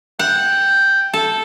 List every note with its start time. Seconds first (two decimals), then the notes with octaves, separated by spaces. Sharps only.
0.19 F#5 G5
1.14 A4